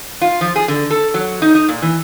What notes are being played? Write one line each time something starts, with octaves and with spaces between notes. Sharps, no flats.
F4
F3
G#4
D3
A4
F#3
D#4
D#4
A#2
E3